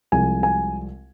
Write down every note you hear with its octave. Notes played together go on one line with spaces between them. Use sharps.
C2 C3 F3 G#3 G#5
G#5